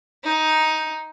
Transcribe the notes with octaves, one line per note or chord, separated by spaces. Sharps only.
D#4